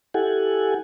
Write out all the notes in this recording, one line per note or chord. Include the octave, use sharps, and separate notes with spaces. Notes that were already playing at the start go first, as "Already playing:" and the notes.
E4 G4 A4 F#5 G#5